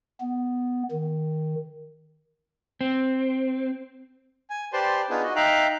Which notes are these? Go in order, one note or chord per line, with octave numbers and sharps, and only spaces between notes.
B3
D#3
C4
G#5
G4 B4 C5 D5 A5 C6
B3 D4 D#4 F4 G#4 B4
F#4 D#5
D#4 E5 F5 G5 A#5 F#6